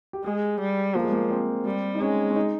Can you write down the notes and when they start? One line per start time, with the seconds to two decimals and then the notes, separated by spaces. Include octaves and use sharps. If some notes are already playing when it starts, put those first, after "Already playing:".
0.13 G4
0.24 G#3 G#4
0.61 G3
0.95 F3 A#3
1.04 G#3
1.12 A#3
1.31 C4
1.66 G3
1.95 D#4
2.01 G#3 C#4
2.31 C#4
2.36 D#4